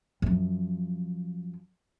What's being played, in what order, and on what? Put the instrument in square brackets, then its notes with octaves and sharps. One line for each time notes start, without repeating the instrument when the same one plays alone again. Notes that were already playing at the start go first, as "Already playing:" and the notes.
[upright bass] F#2 F3